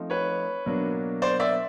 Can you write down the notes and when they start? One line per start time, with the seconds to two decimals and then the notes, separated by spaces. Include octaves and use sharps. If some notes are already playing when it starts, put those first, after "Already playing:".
Already playing: F3 A3 C4 D#4
0.10 B4 C#5
0.66 B2 F#3 A#3 D4
1.22 C5 D5
1.40 D5 E5